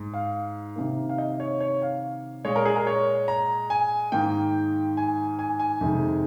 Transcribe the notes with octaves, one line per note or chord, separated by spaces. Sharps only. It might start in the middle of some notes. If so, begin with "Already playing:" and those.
Already playing: G#2
F5
C3 D#3 A#3
F5
D#5
C#5
C#5
F5
A#2 G#3 C#5
A#4
G#4
A#4
C#5
A#5
G#5
G#2 D#3 A#3 G5
G#5
G#5
G#5
F2 C3 D#3 G#3